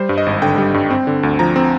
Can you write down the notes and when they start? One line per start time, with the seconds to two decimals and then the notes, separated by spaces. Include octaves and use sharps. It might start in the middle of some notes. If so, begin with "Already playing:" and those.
Already playing: G3 C5
0.09 G2
0.18 D#5
0.26 G#1
0.42 D3 G5
0.58 G3
0.74 G2
0.90 C4
1.07 D3
1.23 D2
1.39 F3 A#5
1.56 C4